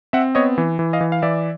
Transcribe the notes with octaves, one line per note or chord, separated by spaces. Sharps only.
C4 E5 F#5
B3 C#5 D#5
E3
E3
D#5 F5
E3
F5
E3 D5 E5